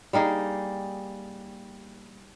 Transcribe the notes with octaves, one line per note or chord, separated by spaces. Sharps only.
G3 A#3 D#4 G#4